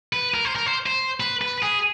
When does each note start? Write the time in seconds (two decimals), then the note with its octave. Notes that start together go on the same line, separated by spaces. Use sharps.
0.13 B4
0.34 A#4
0.45 C5
0.56 A#4
0.66 C5
0.86 C5
1.20 B4
1.41 B4
1.63 G#4